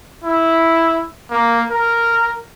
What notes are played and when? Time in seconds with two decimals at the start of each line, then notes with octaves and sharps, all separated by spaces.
0.24 E4
1.31 A#3
1.70 A#4